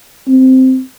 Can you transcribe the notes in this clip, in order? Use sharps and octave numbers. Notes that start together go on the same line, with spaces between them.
C4